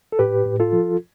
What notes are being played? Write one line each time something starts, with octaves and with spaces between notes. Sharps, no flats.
A4
A2 G4 B4
A2
F4 A4
F3